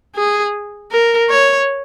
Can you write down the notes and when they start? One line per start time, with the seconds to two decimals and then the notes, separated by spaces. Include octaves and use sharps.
0.16 G#4
0.91 A#4
1.30 C#5